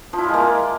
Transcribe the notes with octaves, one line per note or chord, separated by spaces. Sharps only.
F3
E4
F4
G#3
A#3